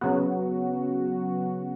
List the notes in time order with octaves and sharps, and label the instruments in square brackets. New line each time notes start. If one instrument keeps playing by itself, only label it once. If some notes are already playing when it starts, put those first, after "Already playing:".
[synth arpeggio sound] C#3 F#3 B3 F#4